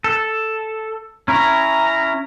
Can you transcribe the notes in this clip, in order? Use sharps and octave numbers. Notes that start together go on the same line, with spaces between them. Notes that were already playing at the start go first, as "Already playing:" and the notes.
A4
C#4 E4 A#5